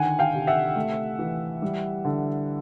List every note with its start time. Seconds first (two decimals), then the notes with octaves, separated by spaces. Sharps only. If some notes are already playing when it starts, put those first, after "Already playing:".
Already playing: D3 D#3 F#5 G#5
0.19 F5 G5
0.34 C3
0.47 E5 F#5
0.76 A3
1.19 E3
1.62 G3
2.05 D3